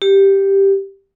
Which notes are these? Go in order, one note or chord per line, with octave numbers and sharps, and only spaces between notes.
G4